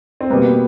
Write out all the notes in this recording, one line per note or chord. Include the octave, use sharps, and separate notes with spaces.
C4
B2 G3 A#3 B3